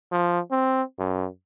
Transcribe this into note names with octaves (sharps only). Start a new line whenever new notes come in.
F3
C4
F#2